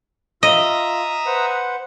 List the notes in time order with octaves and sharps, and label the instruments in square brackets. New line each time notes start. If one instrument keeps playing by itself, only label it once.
[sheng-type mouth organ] F4 [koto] D#5 [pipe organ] E5 A#5 D#6
[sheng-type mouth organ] B4 C5 F#5